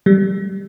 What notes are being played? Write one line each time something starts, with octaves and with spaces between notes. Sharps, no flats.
G3